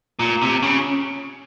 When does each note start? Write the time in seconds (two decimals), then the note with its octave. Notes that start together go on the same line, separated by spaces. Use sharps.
0.19 A#2
0.42 C3
0.62 C#3